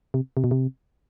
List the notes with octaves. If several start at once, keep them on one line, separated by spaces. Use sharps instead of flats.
C3
C3
B2
C3